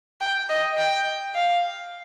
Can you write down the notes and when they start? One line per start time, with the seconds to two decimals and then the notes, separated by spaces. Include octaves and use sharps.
0.21 G5
0.50 D#5
0.77 G5
1.35 F5